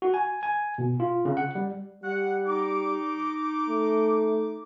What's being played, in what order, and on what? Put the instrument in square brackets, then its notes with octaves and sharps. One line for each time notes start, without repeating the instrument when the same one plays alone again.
[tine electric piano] F#4
G#5
G#5
B2
F4
C#3
F#5
G3
[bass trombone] G3 [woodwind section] F#5
[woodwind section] D#4 D6
[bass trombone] A3